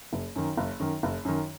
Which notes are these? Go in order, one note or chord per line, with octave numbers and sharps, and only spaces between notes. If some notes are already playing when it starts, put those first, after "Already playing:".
F#1
F#2 D#3
F#1
F#2 D#3
F#1
F#2 D#3